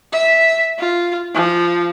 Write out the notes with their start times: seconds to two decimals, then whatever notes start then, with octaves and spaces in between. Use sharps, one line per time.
0.13 E5
0.79 F4
1.35 F3